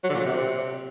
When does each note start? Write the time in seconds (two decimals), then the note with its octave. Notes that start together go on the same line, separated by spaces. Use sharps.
0.04 F#3
0.09 D3
0.15 A#2
0.20 F#3
0.25 C3